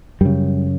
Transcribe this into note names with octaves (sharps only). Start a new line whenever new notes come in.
F#2 C#3 G3